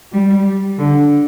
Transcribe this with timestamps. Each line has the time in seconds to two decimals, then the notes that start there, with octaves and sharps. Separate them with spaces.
0.12 G3
0.79 D3